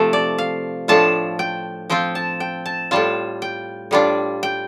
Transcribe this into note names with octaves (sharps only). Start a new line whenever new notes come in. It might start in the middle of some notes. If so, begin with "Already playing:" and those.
Already playing: C3 F3 A3
D5
F5
A2 F3 A3 D4 F4 A5
G5
F3 C4 F4 G5
A5
G5
A5
A2 G3 F4 A5
G5
A2 G3 D4 F4
G5